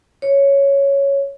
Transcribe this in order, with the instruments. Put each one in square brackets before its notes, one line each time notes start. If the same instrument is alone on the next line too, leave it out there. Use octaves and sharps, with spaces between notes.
[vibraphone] C#5